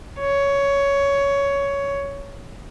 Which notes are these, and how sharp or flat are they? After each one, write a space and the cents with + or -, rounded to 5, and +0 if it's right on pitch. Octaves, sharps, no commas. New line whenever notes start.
C#5 +10